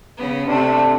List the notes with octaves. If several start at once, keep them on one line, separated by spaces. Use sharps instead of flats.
C#3 B3
C3 A3 D4